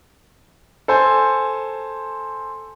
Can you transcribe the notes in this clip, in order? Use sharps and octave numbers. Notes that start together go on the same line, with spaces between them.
A4 C5 G#5